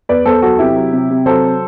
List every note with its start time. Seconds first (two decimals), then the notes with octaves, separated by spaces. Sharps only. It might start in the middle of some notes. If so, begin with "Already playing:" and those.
0.09 E2 B4 D5
0.26 E2 A4 C5
0.42 F#3 F#4 A4
0.59 C3 E4 G4
0.76 F#3
0.93 C3
1.10 C3
1.26 F#3 A4 C5